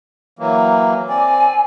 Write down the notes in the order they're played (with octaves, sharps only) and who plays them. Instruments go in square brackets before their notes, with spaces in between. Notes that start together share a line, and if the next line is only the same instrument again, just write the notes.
[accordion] E3 F#3 A#3
[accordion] C4 D5 [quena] G#5